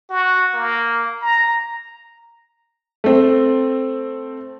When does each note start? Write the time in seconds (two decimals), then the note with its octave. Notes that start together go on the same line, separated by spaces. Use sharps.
0.10 F#4
0.54 A#3
1.22 A#5
3.04 A3 C4